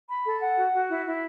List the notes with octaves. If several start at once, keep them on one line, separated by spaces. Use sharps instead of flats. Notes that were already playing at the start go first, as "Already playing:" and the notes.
B5
A4
F#5
F#4
F#4
E4
E4